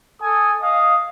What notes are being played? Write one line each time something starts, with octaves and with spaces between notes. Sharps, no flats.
A4 G#5 D#6
D#5 F5 D#6